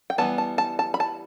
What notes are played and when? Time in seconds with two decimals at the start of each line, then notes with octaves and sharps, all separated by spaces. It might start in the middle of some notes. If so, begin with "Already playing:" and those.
0.10 G5
0.18 E3 G3 B3 A5
0.38 A5
0.58 A5
0.79 A5
0.94 B5
1.00 A5